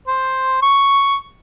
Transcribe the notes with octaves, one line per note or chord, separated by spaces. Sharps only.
C5
C#6